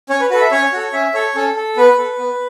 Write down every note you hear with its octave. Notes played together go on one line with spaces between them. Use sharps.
C#4 C#5
B4
F#4 A4 B4
E5
C#4 C#5
F#4 A4
C#4 E5
A4 C#5
C#4 A4
A4
B3 B4
A4
B3